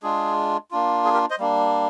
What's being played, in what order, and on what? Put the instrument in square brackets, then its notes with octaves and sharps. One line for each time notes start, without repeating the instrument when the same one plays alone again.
[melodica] G#3 D4 F4 G#4
A#3 D4 F4
G#4
G4 A#4
C5 D#5
G3 A#3 D4